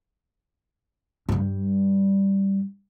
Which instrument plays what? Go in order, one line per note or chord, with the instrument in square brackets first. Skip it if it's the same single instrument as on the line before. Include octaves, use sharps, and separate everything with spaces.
[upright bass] G2 G3